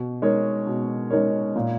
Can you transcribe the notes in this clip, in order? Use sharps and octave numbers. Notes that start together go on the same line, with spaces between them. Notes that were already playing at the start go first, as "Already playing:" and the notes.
Already playing: B2
G#3 D#4 A#4 C#5
B2
G#3 D#4 A#4 C#5
A#2